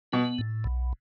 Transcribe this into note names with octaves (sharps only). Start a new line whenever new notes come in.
B2 B3
A2
B1